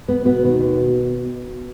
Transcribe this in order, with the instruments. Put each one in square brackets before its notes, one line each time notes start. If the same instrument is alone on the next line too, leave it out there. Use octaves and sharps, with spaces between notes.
[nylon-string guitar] B3
[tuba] B2 [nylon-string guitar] B3
[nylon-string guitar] D#3
D#2